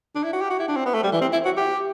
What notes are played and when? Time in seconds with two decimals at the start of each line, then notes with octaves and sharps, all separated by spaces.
0.15 D4
0.24 E4
0.33 F#4
0.41 G4
0.50 F#4
0.59 E4
0.68 D4
0.77 C4
0.86 B3
0.94 A3
1.04 G3
1.12 E3
1.21 C4
1.33 E4
1.45 F#4
1.57 G4